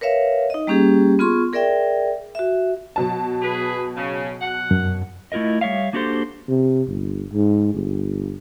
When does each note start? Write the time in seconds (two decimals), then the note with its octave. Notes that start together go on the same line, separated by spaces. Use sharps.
0.01 A#4 B4 C#5 E5 F5
0.50 D#4 D#5
0.67 G3 A#3 C#4 G4 G#4
1.19 B3 F4 G#4 C6 C#6
1.53 G#4 A#4 D5 E5 G5
2.35 F#4 E5
2.96 B2 F#3 A5
3.42 G#4 B4
3.96 C#3
4.41 F#5
4.71 F#2
5.32 A3 E4 F4 A#4 D#5
5.61 G3 C#5 E5 F5
5.93 A#3 D4 F#4 G4 A4 C5
6.48 C3
6.88 G1
7.33 G#2
7.74 G1